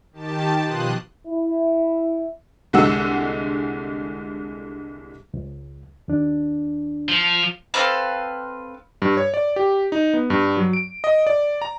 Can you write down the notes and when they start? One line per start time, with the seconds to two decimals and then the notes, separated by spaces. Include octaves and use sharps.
0.12 D#3 G4 A5
0.63 B2 F3 C6 D#6 F#6
1.28 E4
2.73 C2 D3 G#3 F#5 E6
5.34 C#2
6.08 D#2 D4
7.09 F3
7.74 C4 A4 B4 F5
9.02 G2
9.17 C#5
9.34 D5
9.56 G4
9.92 D#4
10.14 B3
10.30 G2
10.57 F#3
10.73 D7
11.04 D#5
11.27 D5
11.62 A#5